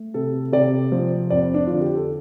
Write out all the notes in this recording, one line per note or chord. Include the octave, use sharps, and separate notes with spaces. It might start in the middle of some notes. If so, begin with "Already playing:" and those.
Already playing: A3
C3 A4
C3 D5
F3
F2 D5
D4
D3 F4
G4
A4